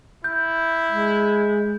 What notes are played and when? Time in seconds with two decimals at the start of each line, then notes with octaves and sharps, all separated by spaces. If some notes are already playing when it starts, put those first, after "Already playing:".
0.24 E4 G6
0.88 G#3